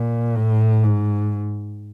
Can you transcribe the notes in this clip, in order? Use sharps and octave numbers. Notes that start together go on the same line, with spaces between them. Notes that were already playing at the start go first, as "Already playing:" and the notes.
Already playing: A#2
A2
G#2